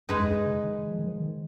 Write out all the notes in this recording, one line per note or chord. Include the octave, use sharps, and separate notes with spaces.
F#2 G#3 D#4 G#4 B4
F2
F#2
C#3
D#3
F3
D#3
F3
D#3